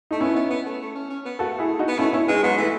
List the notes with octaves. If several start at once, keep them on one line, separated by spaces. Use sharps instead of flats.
A3 D#4
B3 C#4 E4
B3
B3
A3
A3
C#4
C#4
B3
A3 F#4 A4
E4 G#4
D#4 F#4
B3
A3 C#4 E4
C#4 E4
G#3 B3 D#4
F#3 G#3 B3
E3 A3